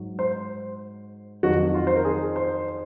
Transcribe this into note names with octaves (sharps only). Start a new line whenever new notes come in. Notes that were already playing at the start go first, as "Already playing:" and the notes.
Already playing: G#2 F#3
C5
F2 D#3 F#3 F#4
F4
C5
A#4
G#4
C5